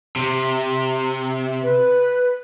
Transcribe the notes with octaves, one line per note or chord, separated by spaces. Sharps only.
C3
B4